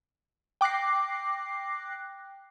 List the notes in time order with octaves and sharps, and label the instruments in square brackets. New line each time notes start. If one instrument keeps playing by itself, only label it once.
[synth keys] G5 D6 F#6 A#6 C7